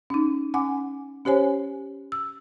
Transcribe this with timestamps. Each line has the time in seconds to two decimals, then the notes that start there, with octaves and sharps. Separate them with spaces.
0.10 C#4 D#4
0.54 C#4 F#5 G#5 D6
1.25 C#4 G4 C5 C#5 G#5
2.12 E6